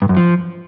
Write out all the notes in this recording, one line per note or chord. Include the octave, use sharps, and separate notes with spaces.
G2
F#2
F3